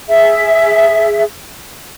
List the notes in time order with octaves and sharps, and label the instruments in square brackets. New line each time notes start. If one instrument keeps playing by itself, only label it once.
[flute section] G#4 E5